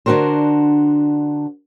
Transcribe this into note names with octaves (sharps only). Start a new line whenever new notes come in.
D3 D4 D#4 F#4 A#4 C5